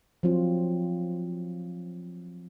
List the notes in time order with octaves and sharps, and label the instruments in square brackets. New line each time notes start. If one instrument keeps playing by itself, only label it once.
[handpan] F3 F#3 C4 F4